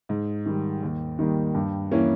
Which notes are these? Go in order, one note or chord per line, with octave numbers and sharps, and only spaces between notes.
G#2
D#3 G3
D#2
D#3 G3 A#3 D#4
G2
E3 A#3 C#4 E4